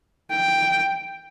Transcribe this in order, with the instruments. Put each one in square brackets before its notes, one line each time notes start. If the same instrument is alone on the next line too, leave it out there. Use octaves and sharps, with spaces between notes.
[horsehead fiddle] G5